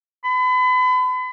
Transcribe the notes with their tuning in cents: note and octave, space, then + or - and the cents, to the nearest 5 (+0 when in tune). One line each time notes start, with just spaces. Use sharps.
B5 +35